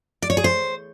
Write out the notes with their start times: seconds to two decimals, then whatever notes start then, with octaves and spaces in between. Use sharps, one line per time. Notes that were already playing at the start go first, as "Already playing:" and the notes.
0.22 D5
0.30 C#5
0.37 G#4
0.44 C5